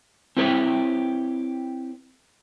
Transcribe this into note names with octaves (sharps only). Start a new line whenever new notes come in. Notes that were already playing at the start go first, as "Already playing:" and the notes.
C4 E4 G4 B4 C#5